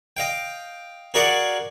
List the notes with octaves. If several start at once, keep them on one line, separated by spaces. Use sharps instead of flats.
D#5 F5 G5
F#4 G#4 A#4 D5 F5 F#5